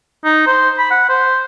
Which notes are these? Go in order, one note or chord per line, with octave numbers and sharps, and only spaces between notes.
D#4
C5
B5
F#5
C5